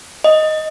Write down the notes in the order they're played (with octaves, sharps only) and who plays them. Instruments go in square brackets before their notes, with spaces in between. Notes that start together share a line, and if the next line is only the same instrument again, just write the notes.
[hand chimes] D#5